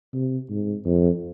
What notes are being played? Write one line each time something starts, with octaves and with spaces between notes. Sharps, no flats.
C3
G#2
F2